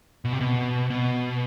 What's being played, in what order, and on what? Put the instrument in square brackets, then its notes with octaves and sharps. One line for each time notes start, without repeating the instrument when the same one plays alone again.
[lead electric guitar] B2
C3
B2
B2